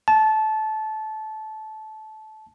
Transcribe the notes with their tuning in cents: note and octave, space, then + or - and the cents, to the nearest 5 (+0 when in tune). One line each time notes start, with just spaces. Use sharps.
A5 -20